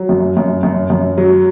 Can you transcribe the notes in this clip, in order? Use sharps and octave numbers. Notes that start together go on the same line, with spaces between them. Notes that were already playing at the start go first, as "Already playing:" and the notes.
Already playing: F#3
F#2
F#2
F#2
F#2
F#3